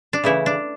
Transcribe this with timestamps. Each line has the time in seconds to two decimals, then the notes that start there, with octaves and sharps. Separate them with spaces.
0.13 D4
0.24 C#3 E3 A3 E4
0.46 D4